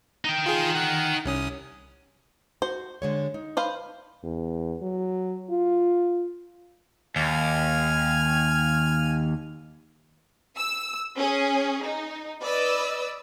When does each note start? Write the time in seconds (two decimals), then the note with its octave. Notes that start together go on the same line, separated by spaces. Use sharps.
0.25 D#4 G5
0.46 F4 G#4
0.75 F#5 F#6
1.25 C2 C#4 D#6
2.62 F#4 C5
3.02 D3 G#3 C#5
3.34 D#4
3.57 B4 C5 F5
4.23 E2
4.82 F#3
5.50 F4
7.16 D#2 G#5 F6
10.57 E6
11.17 C#4 G#4
11.84 D#4
12.42 B4 D5 D#5 E6